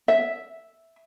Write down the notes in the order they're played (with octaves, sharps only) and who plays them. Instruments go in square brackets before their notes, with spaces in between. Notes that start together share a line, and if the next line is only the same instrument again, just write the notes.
[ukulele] E5